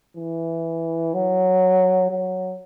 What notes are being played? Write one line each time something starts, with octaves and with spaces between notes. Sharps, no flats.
E3
F#3
F#3